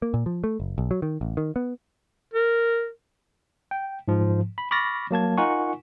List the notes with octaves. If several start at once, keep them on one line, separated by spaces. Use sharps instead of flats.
A#3
A#2
F3
A3
F#1
B1
F#3
D#3
A1
D#3
B3
A#4
G5
G#2 F3
B5
B5 C#6 D6 F6 A6 A#6
F#3 A#3 A5 G#6
D#4 F4 A#4 F#5 G#5 C#6